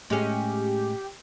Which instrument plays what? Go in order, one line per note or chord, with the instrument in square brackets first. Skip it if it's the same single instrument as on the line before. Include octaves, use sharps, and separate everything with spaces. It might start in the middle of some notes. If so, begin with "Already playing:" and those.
[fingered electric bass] A2 [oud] G#3 C#4 [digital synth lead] G4